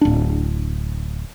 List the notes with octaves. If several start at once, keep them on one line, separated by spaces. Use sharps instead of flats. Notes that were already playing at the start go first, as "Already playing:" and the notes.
D1 D4